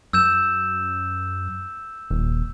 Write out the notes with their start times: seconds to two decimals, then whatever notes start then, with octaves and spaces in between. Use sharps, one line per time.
0.13 F#2 E6 G6 E7
2.11 D#1